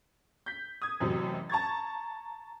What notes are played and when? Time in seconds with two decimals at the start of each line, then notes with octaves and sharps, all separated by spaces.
0.46 G6 B6
0.82 D#6 G#6
1.00 A1 F#2 C3 F#3
1.50 A5 A#5 C#6 G#6 A6